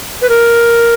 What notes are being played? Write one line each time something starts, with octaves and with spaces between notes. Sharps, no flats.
B4
A#4